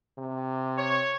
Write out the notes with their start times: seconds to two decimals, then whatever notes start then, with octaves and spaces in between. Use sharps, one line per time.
0.18 C3
0.78 C#5